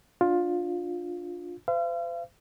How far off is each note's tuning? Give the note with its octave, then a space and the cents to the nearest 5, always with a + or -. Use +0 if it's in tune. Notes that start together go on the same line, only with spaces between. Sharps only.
D4 +0 F4 +15
C5 -40 F5 -40